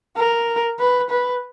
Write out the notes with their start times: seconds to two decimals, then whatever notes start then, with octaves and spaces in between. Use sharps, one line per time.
0.16 A#4
0.79 B4
1.09 B4